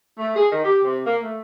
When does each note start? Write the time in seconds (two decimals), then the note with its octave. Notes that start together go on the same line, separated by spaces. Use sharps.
0.18 A3
0.36 G#4
0.52 D#3
0.64 G4
0.84 C3
1.05 A#3
1.23 A3